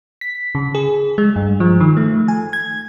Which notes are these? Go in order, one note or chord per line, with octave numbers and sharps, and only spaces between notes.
B6
C#3
G#4
G#3
G2
F3
D#3
A3
G#5
G#6